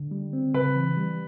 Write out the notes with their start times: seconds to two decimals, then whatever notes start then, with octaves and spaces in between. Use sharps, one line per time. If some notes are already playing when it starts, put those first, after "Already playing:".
Already playing: D3
0.11 G3
0.33 C4
0.54 C#3 B4
0.76 E3
0.97 G3